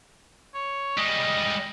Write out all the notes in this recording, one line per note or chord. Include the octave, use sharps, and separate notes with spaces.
C#5
G3 G#3 D#5